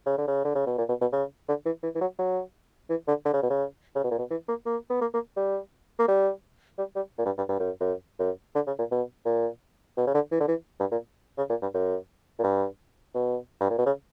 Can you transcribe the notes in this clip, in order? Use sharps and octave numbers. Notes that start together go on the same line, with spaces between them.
C#3
D3
C#3
D3
C#3
B2
A#2
B2
B2
C#3
D3
E3
E3
E3
F#3
F#3
E3
D3
D3
C#3
B2
C#3
C#3
B2
A#2
B2
E3
A#3
A#3
B3
A#3
A#3
G3
A#3
G3
G3
G3
A#2
G2
G2
G2
F#2
F#2
F#2
D3
C#3
A#2
B2
A#2
B2
C#3
D3
E3
D3
E3
G2
A#2
C#3
A#2
G2
F#2
A#2
G2
B2
G2
A#2
B2
C#3